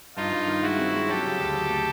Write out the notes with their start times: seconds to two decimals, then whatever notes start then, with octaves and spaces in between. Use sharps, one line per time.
0.16 G2 D#4 F4
0.32 G2
0.47 D#3
0.62 G#3 E4 F#4
0.78 C4
0.94 G#3
1.09 F#3 G4 A4
1.24 C#3
1.40 D2
1.55 F#3
1.70 A3